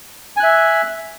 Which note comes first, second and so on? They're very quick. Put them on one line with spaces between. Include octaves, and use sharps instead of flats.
G#5 F#6 E5